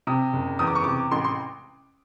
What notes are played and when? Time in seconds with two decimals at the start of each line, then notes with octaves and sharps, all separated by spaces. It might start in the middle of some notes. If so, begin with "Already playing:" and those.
0.07 C3 D#6
0.33 F#1
0.59 E2 D#6
0.67 D6
0.75 C#6
0.84 C3 D6
1.11 A1 C6
1.24 C6